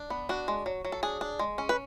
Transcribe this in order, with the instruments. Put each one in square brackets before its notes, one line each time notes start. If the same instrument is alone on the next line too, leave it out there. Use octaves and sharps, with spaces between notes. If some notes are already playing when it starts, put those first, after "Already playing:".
Already playing: [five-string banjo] D4
B3
D4 F#4
G#3
F#3
F#3
A4
D4 G#4
D4
G#3
C#4
B4